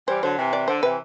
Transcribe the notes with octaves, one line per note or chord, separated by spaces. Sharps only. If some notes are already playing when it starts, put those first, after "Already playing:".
E3 G3 C5
D3 F#3 C5
C3 E3
D5
D3 C5
C3 E3 B4